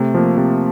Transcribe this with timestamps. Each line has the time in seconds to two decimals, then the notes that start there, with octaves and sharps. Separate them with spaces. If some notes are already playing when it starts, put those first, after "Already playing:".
Already playing: C3 A3
0.14 F3 A#3
0.38 C3